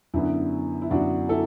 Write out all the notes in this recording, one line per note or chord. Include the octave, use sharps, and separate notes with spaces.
F#2 D3 B3 E4
E4
F#2 D3 B3 D4 F#4
E4 A4